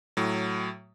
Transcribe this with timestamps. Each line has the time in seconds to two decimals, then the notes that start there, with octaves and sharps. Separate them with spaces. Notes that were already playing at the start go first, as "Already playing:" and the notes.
0.17 A2 F#3